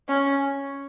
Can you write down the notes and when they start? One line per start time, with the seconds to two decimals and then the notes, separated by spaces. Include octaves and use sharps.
0.09 C#4